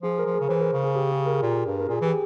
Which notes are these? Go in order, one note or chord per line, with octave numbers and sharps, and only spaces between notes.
F3 G#4
A#4
F3
G#4
C#3
E3 C5
A#4
C#3
G#4
G4
G#4
A#4
A#2
G2
A#4
A#2 G#4
E3 G4